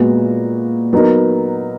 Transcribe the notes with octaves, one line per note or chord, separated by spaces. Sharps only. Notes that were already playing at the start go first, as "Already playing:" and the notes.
Already playing: A#2 G#3 B3 F#4
F#3 B3 D#4 A#4